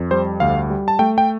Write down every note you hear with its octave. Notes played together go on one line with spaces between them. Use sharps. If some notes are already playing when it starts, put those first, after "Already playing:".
Already playing: F2
G3 C5
D2 F5
G3
A5
A3 G5
G5